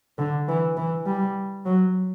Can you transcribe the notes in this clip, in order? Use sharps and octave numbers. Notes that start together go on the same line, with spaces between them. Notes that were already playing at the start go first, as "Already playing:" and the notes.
D3
E3
E3
G3
F#3